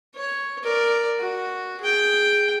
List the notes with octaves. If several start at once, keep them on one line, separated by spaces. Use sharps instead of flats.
C#5
A#4 D5
F#4
G#4 G5